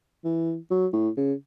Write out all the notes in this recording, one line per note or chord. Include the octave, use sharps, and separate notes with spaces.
E3
F#3
A2
C#3